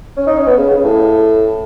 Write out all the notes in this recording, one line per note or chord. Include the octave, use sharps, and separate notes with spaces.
C#4
D#4
C#4
B3
C#3
C#3
A2